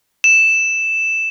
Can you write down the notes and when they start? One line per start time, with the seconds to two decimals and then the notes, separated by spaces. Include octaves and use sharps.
0.24 E7